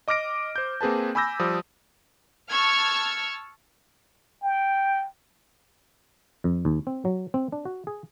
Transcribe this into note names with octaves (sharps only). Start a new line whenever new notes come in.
D#5 D6 F6 A#6 D7
C5 G6
A#3 C4 G#4 B4 A5
G#5 B5 D6 E6 G6 A#6
F3 G3 D#6
A5 C#6 E6 F6 G#6
G5
F2
D#2
C4
F#3
C4
D4
F#4
G#4